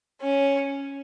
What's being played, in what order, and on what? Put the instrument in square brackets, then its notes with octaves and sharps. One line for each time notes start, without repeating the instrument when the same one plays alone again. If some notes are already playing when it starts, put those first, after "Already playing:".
[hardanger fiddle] C#4